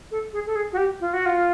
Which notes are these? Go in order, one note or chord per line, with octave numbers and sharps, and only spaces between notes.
A4
G#4
A4
G#4
F#4
G4
F4
F#4
F4